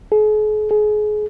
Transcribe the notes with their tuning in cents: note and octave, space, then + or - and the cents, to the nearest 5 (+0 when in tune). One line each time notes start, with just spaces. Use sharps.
G#4 +45
G#4 +30